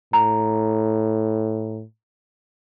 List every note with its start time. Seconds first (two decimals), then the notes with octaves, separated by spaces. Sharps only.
0.13 A2 A#5